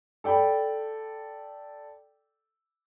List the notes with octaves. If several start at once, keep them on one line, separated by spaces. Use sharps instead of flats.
A4 D5 G5 B5